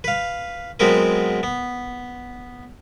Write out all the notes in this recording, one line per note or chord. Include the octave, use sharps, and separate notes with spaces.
B4 F5
F#3 G#3 B3 C4 A#4 B4
B3